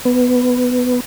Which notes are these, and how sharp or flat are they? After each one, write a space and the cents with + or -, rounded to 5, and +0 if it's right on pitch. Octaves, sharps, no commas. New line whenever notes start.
B3 +10